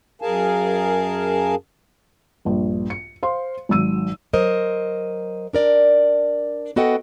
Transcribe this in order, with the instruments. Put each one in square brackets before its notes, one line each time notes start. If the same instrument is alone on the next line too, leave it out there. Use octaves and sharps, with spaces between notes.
[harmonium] F#2 G#4 A#4 F5 G#5 A5
[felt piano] A#1 G2
C#7
C5 F5 C6
G#1 F#3 E6 D#7
[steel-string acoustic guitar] F#3 A#4 C5 D#5
D4 A#4 D5
B3 F#4 A4 D#5 F#5 G5